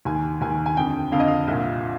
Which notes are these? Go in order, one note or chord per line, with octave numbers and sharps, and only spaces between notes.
D#2 D#3 G#5
D#2 D#3 G#5
G#5
F2 D3 G5
F2 D3 F5
D#5
F5
C2 A#2